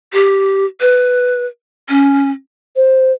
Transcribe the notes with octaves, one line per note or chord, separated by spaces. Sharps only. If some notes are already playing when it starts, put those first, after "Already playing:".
G4
B4
C#4
C5